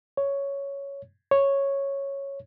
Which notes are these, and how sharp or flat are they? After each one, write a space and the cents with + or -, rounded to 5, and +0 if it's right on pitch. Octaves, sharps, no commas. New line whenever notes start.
C#5 +5
C#5 -5